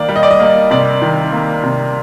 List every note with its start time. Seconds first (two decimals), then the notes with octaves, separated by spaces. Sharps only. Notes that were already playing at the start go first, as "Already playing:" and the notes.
Already playing: D#3 A#3 D5
0.09 G3
0.16 D#5
0.23 D5
0.31 D#5
0.40 A#3
0.71 C3 D5
1.02 D#3
1.32 A#3
1.63 C3